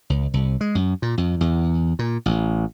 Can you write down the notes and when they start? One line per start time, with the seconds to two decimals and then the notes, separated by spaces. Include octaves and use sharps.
0.10 C#2
0.34 C2
0.61 G#3
0.75 F#2
1.02 A#2
1.18 F2
1.41 E2
1.99 A#2
2.26 A1